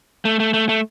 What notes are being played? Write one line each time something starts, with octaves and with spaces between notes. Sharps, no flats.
A3
A3
A3
A3